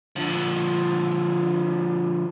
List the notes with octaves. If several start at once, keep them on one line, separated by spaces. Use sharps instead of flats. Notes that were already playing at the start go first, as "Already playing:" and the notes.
D3 F3